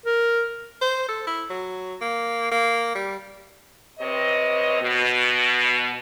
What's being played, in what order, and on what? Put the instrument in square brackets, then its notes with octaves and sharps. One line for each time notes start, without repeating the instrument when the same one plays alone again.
[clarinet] A#4
[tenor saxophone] C5
A4
E4
F#3
A#3
A#3
G3
[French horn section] C3 C4 B4 C#5 D#5
B2